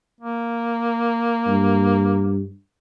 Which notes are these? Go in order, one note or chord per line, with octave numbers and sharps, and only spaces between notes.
A#3
G2